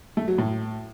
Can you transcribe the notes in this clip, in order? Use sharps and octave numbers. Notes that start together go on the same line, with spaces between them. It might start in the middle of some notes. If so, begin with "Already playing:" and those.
A3
F#3
A2